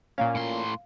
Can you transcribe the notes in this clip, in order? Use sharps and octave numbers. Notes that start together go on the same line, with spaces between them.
A#2 A#3 C#4 F5
A2 C6